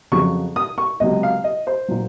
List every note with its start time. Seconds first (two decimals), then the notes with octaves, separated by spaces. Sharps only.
0.12 F2 C#3 F#3 C#6
0.56 D#6
0.78 C#6
1.00 C#2 C3 F#3 D#5
1.23 F5
1.44 D#5
1.67 C5
1.88 A#2 F#3